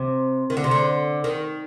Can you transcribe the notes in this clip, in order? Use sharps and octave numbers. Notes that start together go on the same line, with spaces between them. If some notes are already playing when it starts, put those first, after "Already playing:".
Already playing: C3
D#3
D3
C3
D3
D#3